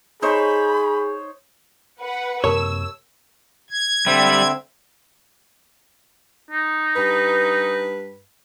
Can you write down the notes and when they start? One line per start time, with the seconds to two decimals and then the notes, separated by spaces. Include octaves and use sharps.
0.22 D#4 G#4 C5 C#5 B5
2.01 B4 F#5
2.44 F#2 C3 A#3 G4 A#4 C#5 A5 E6
3.70 G#6
4.07 D3 G3 C4 E5
6.51 D#4
6.96 G2 B4